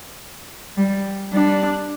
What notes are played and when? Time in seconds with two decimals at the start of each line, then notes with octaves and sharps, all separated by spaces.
0.77 G3
1.33 G3 D4